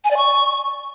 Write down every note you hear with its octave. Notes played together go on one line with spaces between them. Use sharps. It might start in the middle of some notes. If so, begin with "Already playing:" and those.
G#5
D5
C#6